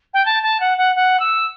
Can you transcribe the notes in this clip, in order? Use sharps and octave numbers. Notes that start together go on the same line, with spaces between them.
G5
A5
A5
F#5
F#5
F#5
E6